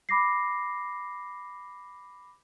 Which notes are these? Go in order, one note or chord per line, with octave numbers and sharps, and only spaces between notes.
B5 D6 A#6 C7